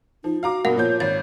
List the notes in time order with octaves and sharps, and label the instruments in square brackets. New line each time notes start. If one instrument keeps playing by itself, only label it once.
[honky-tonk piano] F3 [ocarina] D#4
[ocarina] F#4 [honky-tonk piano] F5 A#5 D6
[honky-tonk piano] G2 B2 [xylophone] A#4 F5 F#5
[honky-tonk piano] A#2 F3 G6 [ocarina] C#5
[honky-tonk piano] G#1 [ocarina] C#5 [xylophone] A6